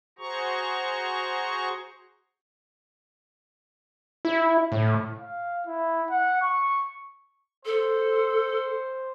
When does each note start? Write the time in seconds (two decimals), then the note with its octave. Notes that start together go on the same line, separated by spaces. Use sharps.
0.19 F#4 G#4 C5 A#5 C#6
4.25 E4
4.72 A2
5.19 F5
5.67 E4
6.10 F#5
6.42 C#6
7.65 A4 C5